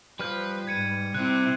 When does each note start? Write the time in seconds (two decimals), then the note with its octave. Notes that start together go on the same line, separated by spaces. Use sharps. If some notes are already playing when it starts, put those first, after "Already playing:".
0.20 F3 G3 B4 F6 G6
0.67 G#2 G#6 C#7 D#7
1.15 C3 C4 E4 F#6